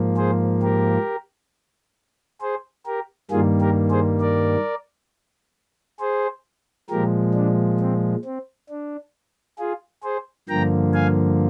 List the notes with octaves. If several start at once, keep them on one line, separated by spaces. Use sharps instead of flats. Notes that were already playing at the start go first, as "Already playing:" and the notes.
Already playing: G#2 F3 A#3
G#4 C5
G4 A#4
G#4 C5
G4 A#4
G2 D#3 G3 A#3 F4 G#4
G4 A#4
G#4 C5
A#4 D5
G#4 C5
A#2 F3 G#3 G4 A#4
D4
C4
C4
D4
F4 G#4
G#4 C5
G2 D3 F3 A#3 G5 A#5
F5 G#5